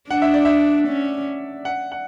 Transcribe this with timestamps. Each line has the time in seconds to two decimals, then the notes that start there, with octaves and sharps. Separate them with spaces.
0.10 D4 F#5
0.22 E5
0.34 D5
0.45 E5
0.88 C#4
1.65 F#5
1.92 F#5